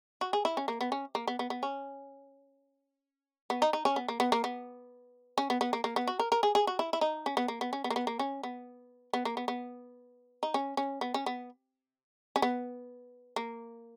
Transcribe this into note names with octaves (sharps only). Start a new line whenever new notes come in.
F#4
G#4
E4
C#4
A#3
B3
C#4
A#3
B3
B3
B3
C#4
B3
D#4
D#4
C#4
B3
A#3
B3
A#3
B3
C#4
B3
B3
A#3
A#3
B3
F#4
A#4
A#4
G#4
G#4
F#4
E4
E4
D#4
C#4
B3
A#3
B3
C#4
B3
A#3
B3
A#3
C#4
B3
B3
A#3
B3
B3
D#4
C#4
C#4
B3
C#4
B3
C#4
B3
A#3